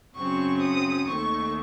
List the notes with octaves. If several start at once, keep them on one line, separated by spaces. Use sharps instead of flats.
F#2 C#3 F#3 C4 C#6
D#6
D#2 D#3 A3 C#6